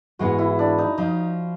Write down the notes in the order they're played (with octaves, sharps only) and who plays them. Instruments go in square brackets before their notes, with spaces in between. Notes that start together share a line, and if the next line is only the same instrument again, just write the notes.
[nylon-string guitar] G#2 E3 G#3 B3 [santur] F#4
[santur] E4
D4
D#4
[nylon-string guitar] F3 [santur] D#4